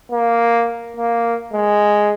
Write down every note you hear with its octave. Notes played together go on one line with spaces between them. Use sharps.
A#3
A#3
G#3